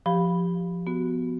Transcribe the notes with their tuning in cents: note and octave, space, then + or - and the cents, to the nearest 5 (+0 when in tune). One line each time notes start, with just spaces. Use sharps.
F3 +0 G4 +0 B5 +0
B3 +10 F#4 +0